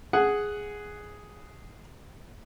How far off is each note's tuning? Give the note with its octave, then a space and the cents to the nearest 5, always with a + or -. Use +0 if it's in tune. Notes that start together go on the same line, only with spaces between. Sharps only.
G#4 +0 F#5 +5